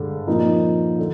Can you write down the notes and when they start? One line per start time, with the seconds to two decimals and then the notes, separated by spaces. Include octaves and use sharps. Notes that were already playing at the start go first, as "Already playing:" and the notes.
Already playing: G2 D3 G#3 D4
0.27 A#2 F3 C4 D#4 A#4
0.99 D3